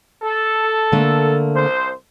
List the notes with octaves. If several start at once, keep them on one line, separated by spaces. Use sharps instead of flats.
A4
D3 A3 A#3
C2 C5